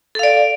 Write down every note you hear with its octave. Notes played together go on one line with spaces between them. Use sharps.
A4 D5 F5